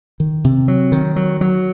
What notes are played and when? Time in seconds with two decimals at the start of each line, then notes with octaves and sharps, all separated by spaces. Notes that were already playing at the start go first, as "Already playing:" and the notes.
0.20 D#3
0.44 C3
0.68 F#3
0.92 D#3
1.16 F#3
1.41 F#3